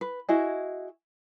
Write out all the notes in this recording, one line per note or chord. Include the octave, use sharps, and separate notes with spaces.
B4
E4 F#4 G#4 D#5